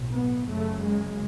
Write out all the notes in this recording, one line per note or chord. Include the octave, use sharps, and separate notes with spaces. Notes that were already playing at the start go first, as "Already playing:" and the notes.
Already playing: B1 A2
B3
F#1 F#2 C#3 A3
G#3